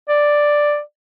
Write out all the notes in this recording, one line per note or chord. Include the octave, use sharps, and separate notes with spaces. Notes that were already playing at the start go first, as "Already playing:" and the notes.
D5